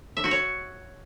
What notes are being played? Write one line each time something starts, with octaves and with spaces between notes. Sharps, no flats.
E5
F#4
C#5